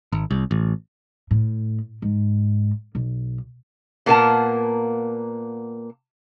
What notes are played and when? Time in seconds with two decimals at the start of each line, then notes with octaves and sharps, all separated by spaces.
0.12 G#1
0.31 C2
0.51 A1
1.31 A2
2.02 G#2
2.95 B1
4.06 A#2 A#3 B3 A#4 F#5 A5